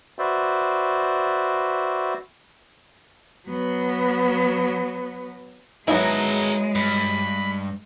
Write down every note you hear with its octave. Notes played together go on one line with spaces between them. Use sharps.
F#4 B4 C5 D5 E5
F#3 B3
F#3 G#3 B3 D#4 E4 G#4 A#4
G2 B5